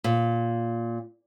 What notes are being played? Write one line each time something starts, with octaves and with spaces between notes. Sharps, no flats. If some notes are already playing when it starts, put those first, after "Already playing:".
A#2